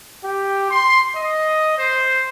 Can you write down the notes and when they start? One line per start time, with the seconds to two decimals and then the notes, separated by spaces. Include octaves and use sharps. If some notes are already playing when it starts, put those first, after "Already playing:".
0.23 G4
0.71 C6
1.16 D#5
1.78 C5